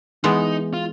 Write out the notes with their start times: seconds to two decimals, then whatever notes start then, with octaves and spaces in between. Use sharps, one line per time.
0.24 E3 G#3 B3 D#4
0.73 F4